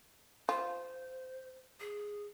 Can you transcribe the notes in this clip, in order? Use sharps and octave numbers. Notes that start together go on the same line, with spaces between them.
F4 C5
G#4